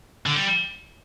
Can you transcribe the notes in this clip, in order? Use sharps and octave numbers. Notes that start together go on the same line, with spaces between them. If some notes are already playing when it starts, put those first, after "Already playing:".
D3
G3